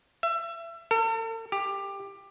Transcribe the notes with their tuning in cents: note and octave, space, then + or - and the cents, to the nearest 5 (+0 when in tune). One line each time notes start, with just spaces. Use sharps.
E5 +30
A4 +45
G4 +15